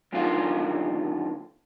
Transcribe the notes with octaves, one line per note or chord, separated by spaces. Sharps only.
F#2 A#2 D3 D#3 F4